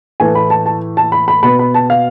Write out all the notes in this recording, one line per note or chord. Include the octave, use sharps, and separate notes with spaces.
A2 E3 A3 G#5
B5
A5
A5
A5
B5
B5
B2 B3 B5
B5
A5
F5